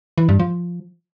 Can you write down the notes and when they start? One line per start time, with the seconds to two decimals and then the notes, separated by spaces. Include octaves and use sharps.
0.18 E3
0.29 G2
0.40 F3